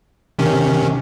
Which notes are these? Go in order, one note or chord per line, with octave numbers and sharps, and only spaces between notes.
C3 D#3 C#4